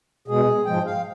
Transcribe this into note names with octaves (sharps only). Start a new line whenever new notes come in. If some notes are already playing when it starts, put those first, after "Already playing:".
B2 G#3 G#4
G#2 F3 G#3 G5
F5